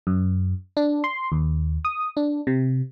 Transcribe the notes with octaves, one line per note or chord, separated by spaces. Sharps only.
F#2
D4
C6
D#2
D#6
D4
C3